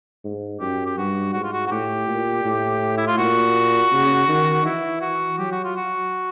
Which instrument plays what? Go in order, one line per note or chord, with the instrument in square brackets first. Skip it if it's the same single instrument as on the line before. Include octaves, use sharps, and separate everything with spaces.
[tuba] G#2
[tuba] F#2 [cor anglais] G4
[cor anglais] G4
[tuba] G2 [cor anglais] F#4
[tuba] G#2 [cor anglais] F#4
[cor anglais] F4
F#4
F#4
[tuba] A2 [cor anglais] G4
[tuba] A#2
A2
[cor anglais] E4
F4
[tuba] A#2 [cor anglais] F#4
[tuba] C#3
D#3
[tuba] E3 [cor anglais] E4
[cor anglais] F#4
[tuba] F#3 [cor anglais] G4
[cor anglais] F#4
F4
F#4